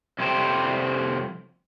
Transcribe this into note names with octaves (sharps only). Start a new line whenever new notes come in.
F2 C3 G3 C5 G5